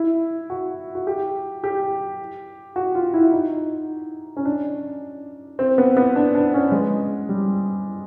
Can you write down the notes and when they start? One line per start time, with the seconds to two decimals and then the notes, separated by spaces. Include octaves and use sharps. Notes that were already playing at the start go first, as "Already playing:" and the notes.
Already playing: E4
0.50 F#4
0.95 F#4
1.07 G4
1.63 G4
2.76 F#4
2.95 F4
3.14 E4
3.33 D#4
4.37 C#4
4.45 D4
5.59 C4
5.78 B3
5.97 B3
6.16 D4
6.35 D4
6.54 C#4
6.72 G#3
7.29 G3